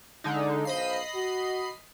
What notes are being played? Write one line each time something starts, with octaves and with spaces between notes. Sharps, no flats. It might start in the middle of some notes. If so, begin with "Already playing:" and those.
D3 G#3 D#4
B1 C5 D#5 F5 B5 C7
F#4